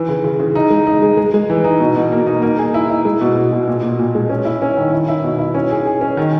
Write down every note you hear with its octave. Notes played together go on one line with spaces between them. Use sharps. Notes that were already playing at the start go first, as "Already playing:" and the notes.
Already playing: E3
C#3
C#3
C#3
D#4
G#3
D#4
G#3
G#3
G#3
E3
D#4
B2
B2
A#3
D#4
A#3
G#4
E4
E4
G#3
B2
B2
B2
A#2
A#2
A#2
G#3
C#4
E4
C#4
D#3
E4
E4
B2
E4
C#4
G#4
G#4
C#4
D#3